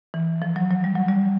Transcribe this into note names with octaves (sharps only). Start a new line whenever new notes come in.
E3
F3
F#3
F#3
G3
F#3
G3